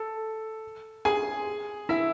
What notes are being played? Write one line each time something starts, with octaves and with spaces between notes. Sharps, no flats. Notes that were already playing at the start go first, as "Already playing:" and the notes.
Already playing: A4
G#4 G#5
E4 E5